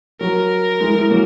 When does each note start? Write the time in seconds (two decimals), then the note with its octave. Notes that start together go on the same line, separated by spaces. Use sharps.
0.21 F#3 A#4
0.80 E3 G#3
0.95 E3 G#3
1.10 F#3 A#3